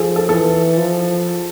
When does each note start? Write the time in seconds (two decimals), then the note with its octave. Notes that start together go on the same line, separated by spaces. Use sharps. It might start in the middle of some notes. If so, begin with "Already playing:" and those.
Already playing: F3 G#4 A4
0.16 A4
0.29 E3 A4
0.78 F3